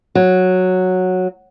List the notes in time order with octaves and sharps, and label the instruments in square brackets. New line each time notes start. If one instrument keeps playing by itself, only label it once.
[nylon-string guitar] F#3